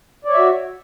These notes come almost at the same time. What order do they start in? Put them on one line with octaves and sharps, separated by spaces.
D5 C#5 E5 F#4